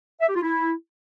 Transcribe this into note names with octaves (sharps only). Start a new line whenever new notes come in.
E5
G4
F4
E4